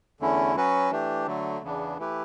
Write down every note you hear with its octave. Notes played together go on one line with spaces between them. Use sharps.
E2 D3 A3 C#4 E4
F#3 C#4 F#4 B4
E3 A3 D4 G4
D3 F#3 A3
E2 C#3 E3 B3 D4
E3 A3 E4 G4 B4